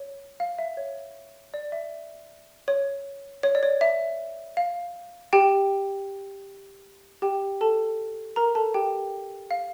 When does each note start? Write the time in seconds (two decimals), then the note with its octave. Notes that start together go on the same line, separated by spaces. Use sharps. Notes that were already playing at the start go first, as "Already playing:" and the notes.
Already playing: C#5
0.40 F5
0.59 E5
0.77 C#5
1.54 D5
1.72 E5
2.68 C#5
3.43 C#5
3.55 D5
3.63 C#5
3.81 E5
4.57 F5
5.33 G4 G5
7.22 G4 G5
7.61 A4 A5
8.36 A#4 A#5
8.55 A4 A5
8.74 G4 G5
9.51 F5